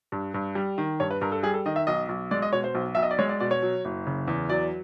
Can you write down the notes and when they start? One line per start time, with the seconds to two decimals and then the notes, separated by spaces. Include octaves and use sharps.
0.12 G2
0.34 G2
0.55 G3
0.78 D#3
1.00 G2 C#5
1.11 B4
1.21 G2 A#4
1.32 A4
1.43 G3 G#4
1.54 A4
1.66 D#3 D#5
1.76 E5
1.87 B1 D#5
2.09 B1
2.31 G#3 D5
2.42 D#5
2.53 B2 C#5
2.64 C5
2.75 B1
2.95 B1 E5
3.03 D#5
3.11 D5
3.19 G#3 C#5
3.29 D5
3.40 B2 D5
3.51 C#5
3.63 F#3
3.85 F#1
4.07 C#3
4.28 E2
4.50 F#3 D5